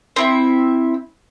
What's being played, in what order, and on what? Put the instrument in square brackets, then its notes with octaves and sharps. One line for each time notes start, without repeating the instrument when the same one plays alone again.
[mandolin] C4 E4 E5